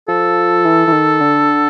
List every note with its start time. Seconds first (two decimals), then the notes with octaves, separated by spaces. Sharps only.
0.08 F3 A4
0.65 E3
0.88 E3
0.92 D#3
1.20 D3